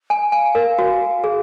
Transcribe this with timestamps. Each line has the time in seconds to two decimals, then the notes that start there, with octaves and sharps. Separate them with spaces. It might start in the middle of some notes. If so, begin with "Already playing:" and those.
0.10 G#5
0.32 F5 G#5
0.55 A#4
0.79 F#4
1.24 G#4